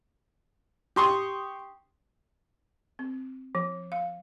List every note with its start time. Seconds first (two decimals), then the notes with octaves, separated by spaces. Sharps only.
0.96 G4 C6 C#6 D#6
2.99 C4
3.55 F3
3.92 F5